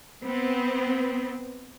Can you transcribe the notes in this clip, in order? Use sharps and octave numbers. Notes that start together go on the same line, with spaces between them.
B3 C4